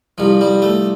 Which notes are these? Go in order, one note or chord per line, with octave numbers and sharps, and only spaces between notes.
C2 C3 F3
G3
A3